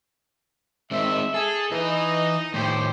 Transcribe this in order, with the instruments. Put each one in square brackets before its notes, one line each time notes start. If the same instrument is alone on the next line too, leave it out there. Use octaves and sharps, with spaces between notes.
[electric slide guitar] G#3 C4 D#4 [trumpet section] E5
[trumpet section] G#4 [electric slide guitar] A4
[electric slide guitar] E3 E4 B4 [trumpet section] D#4 D#5
[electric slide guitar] A2 D#3 A3 [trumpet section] G4 C5 G5